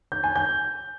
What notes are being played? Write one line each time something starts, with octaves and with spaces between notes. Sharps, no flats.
G6
G#5
G6